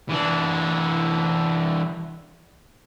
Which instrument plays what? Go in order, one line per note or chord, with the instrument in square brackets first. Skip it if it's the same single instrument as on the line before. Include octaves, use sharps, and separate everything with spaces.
[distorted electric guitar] E3 D4